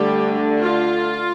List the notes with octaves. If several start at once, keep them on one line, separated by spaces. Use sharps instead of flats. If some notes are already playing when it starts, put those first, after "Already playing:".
Already playing: D3 G3 A3 D4 G4
F4